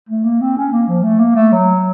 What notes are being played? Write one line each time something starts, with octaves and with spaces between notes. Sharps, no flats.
A3
A#3
C4
C#4
A#3
F3
A3
A#3
A3
F#3